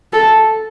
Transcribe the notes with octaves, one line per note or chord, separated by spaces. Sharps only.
A4